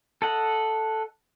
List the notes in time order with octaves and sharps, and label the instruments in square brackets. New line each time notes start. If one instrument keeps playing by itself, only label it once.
[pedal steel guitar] A4 D#5 F#5